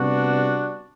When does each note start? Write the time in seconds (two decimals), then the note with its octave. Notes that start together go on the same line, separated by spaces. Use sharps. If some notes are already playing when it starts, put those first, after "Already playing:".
Already playing: C3 G3 B3 D4 F#4